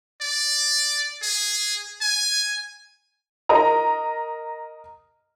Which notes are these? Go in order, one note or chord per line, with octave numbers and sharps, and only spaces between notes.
D5
G#4
G#5
A#4 D#5 A#5